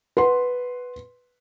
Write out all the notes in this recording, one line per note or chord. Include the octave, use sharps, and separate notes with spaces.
B4 F#5 C6